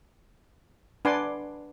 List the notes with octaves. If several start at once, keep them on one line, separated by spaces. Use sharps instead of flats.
D4 B4 F#5 G#5 C6 D6